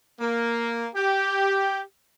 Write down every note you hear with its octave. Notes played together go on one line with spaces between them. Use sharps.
A#3
G4